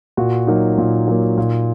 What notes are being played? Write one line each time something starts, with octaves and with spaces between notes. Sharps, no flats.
A#2 F#4
F#3 A#3 D#4
A#2
F#3 A#3
A#2